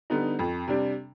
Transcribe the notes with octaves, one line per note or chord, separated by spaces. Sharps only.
D3 G3 B3 D#4
F2
C3 G3 D4